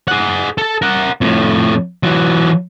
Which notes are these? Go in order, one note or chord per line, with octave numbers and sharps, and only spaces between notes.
G#4 F#5
A4 A5
A#4 F#5
F2 A2
E3 F#3